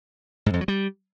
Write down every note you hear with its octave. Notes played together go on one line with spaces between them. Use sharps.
G#2
F2
F#3
G3